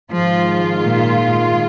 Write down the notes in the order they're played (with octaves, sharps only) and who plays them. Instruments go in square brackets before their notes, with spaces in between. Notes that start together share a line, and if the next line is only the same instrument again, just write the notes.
[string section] G#2 D#3 G#3 F4 [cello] F3
[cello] A#2